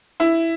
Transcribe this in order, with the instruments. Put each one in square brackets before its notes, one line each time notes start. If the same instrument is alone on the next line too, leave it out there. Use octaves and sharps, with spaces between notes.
[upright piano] E4